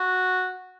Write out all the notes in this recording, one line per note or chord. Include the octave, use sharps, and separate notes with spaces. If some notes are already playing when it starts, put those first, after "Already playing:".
Already playing: F#4